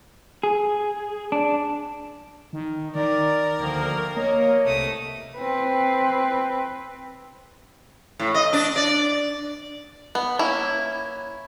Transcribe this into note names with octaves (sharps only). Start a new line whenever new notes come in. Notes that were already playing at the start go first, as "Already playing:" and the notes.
G#4
D4
D#3
D#3 A#4 D5
D2 D#3 F3 A#3
A#3 C#5 D#5
C2 A3 D#6
C4 B4
A2
D#5
D4
D5
B3
A#3 C#4 E4